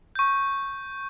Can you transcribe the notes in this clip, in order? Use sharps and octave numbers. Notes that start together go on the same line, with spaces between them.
C#6 G6